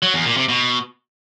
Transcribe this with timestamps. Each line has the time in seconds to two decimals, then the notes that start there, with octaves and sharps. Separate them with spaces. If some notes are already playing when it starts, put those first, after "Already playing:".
0.03 F#3
0.14 E2
0.25 A#2
0.37 C3
0.48 B2